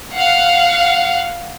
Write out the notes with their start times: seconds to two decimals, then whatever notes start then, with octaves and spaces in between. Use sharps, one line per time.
0.14 F5 F#5